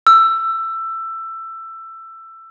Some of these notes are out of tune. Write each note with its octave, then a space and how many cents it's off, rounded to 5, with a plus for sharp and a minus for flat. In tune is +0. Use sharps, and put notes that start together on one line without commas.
E6 +15